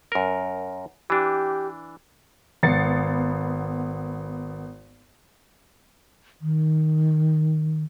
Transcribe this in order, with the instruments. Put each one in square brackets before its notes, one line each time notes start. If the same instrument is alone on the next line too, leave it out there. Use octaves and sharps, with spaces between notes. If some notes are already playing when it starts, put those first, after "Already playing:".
[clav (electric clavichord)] F#2 A#4
[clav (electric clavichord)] E3 D4 [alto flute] G4
[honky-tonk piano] G#1 B3 A6 C7 C#7
[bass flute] D#3